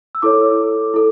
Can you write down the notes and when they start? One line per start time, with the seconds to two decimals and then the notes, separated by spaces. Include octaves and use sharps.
0.15 E6
0.22 E4 A4 C#5 D6
0.94 E4 A4